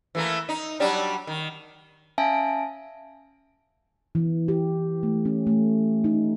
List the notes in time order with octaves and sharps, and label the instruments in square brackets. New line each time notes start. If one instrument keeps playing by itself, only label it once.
[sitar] E3 A3 A#3
D#4
F#3 G3 D4
D#3
[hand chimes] C#4 E5 F5 G#5 A5 D7
[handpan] E3
G4
A3
C#4
A3
D#4